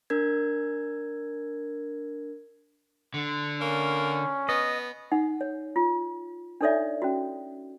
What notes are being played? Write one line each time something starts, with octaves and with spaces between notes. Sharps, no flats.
D4 A#4 G#6
D3
A#3 C#4
B3 D#5
D#4 F#5
C#5
F4
D4 D#4 A4 C#5 D5 E5
C#4 F#4